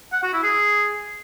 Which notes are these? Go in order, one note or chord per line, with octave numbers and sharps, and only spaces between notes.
F#5
F#4
E4
G#4